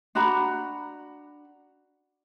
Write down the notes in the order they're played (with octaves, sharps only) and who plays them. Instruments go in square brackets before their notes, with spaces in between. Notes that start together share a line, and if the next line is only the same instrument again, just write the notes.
[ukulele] D4 F#4 A#5 B5